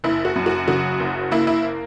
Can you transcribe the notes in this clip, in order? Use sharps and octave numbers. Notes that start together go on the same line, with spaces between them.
F#1 E4
F#4
F#2
F#4
C#3 F#4
F#1
A#3 E4
E4